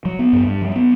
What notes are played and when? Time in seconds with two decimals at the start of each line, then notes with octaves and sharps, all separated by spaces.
0.05 F#3
0.19 B3
0.33 G2
0.47 G2
0.62 F#3
0.76 B3